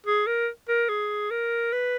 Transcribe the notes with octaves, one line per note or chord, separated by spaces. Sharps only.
G#4
A#4
A#4
G#4
A#4
B4